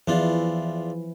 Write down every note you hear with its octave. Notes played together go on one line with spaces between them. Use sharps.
E2 E3 F3 D4 E4 F4